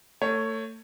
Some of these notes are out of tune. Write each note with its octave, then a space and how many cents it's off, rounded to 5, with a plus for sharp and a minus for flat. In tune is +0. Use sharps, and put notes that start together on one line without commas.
A3 +30 C#5 +0